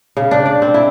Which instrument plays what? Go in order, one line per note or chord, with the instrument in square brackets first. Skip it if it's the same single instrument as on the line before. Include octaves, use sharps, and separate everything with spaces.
[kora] C#3
D4
D5
C4
E4